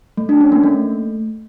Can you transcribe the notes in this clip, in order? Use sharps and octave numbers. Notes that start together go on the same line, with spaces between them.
A3
D4
C#4
A#3
A3